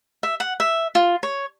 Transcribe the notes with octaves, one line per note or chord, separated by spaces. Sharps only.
E5
F#5
E5
F4
C#5